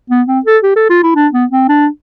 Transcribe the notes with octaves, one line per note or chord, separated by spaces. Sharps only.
B3
C4
A4
G4
A4
F4
E4
D4
B3
C4
D4